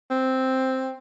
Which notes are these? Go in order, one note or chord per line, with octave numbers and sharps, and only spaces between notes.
C4